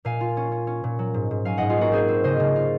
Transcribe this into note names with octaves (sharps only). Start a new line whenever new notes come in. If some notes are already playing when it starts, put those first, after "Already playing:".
A#2 F5 G#5
F4
C#4
C#4
C#4
A#2
F#3
G#2
G#2
F#3 F5 G#5
G#2 D#5 F#5
F4 G#4
A#3 F#4 A#4
C4 G#4 C5
C4
C#3 C5 D#5
C#3
F4